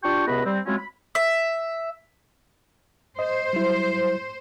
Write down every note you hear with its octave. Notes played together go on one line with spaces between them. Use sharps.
D4 F4 G4 G5 C#6
C#2 C3 B3 F#4 D#5 B5
G3 C4
F#3 G#3 C4 C#4 E4 F4
B5
E5
C5 D#5
F#3 G3 E4